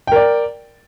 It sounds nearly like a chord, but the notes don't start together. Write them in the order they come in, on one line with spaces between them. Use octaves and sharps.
G5 A#4 D5